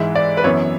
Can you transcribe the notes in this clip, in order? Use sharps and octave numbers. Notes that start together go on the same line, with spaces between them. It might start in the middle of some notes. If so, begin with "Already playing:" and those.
Already playing: G#2 E3 G#3 E5
D5
B4
F#2 E3 B3 C#5